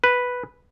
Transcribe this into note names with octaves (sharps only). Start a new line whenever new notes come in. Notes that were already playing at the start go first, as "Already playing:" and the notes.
B4